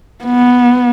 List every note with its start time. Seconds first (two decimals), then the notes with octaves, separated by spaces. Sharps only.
0.25 B3